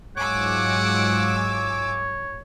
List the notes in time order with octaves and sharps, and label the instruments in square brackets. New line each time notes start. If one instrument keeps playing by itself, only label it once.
[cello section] G#2 F#3 F4 [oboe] C#5 [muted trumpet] F#5 [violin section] G#5 D6 E6